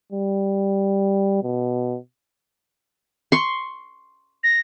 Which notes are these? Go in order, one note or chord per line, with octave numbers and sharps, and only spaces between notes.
G3
B2
C6 C#6
A#6